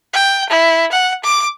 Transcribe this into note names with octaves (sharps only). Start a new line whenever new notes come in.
G5
E4
F#5
D6